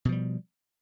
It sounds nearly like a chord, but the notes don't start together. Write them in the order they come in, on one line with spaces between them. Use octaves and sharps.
B2 F3 G3